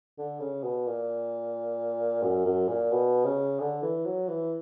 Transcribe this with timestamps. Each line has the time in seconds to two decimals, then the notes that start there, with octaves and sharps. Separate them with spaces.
0.18 D3
0.40 C#3
0.63 B2
0.87 A#2
2.23 F#2
2.46 F#2
2.68 A#2
2.91 B2
3.25 C#3
3.60 D3
3.83 E3
4.05 F#3
4.28 E3